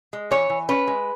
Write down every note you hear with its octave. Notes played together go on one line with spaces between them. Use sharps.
G#3
E3 C#5
E3
C#4 B4
G#3